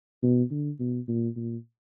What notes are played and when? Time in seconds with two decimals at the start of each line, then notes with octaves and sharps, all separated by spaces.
0.23 B2
0.51 D3
0.80 B2
1.08 A#2
1.37 A#2